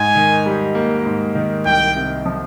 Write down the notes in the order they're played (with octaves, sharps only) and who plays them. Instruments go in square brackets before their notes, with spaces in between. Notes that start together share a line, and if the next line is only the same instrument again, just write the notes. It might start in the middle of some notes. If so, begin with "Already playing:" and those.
Already playing: [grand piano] G#2 [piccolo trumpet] G#5
[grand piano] D#3
G3
A#3
G#2
D#3
[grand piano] C2 [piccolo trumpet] G5
[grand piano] C3
F3